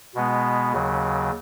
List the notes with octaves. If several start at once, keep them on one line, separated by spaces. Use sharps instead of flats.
B2 G#3 B3
D#2 C#3 F#3